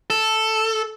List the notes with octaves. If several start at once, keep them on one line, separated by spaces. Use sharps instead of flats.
A4